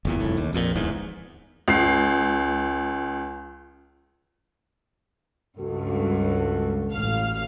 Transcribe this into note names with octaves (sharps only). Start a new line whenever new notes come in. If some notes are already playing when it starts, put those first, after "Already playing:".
F#1 E2 A#2
F1 C2 A2
D#2
A#1 F2 A#2
D1 E2 G#2
C#2 C7
C#2 G2 F#4 A4
A1 F5 F6